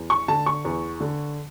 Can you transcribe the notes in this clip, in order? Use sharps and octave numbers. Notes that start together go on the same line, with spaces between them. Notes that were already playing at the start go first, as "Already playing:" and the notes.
Already playing: E2
C#6
D3 A5
C#6
E2
D3